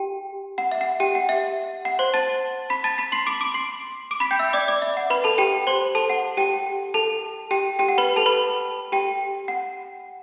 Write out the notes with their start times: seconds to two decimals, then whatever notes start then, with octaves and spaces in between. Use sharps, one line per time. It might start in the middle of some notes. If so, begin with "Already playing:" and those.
Already playing: G4 G5
0.58 F#5
0.72 E5
0.81 F#5
1.00 G4 G5
1.15 F#5
1.29 E5
1.85 F#5
1.99 C5 C6
2.14 A5 A6
2.70 B5 B6
2.84 A5 A6
2.98 B5 B6
3.12 C6 C7
3.27 D6 D7
3.41 D6 D7
3.54 C6 C7
4.11 D6 D7
4.20 B5 B6
4.31 G5 G6
4.39 E5 E6
4.53 D5 D6
4.68 D5 D6
4.82 E5
4.97 F#5
5.10 B4 B5
5.24 A4 A5
5.38 G4 G5
5.67 C5 C6
5.95 A4 A5
6.10 F#5
6.37 G4 G5
6.94 A4 A5
7.51 G4 G5
7.79 G4 G5
7.88 F#5
7.98 B4 B5
8.16 A4 A5
8.26 B4 B5
8.92 G4 G5
9.48 F#5